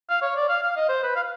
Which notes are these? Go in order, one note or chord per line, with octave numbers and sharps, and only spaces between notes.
F5
C#5
D5
F5
F5
D#5
C5
B4
F5